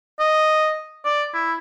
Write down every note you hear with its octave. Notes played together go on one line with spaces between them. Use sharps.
D#5
D5
E4